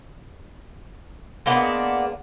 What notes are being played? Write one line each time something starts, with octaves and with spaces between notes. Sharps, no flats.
G#3 A#3 B3 D4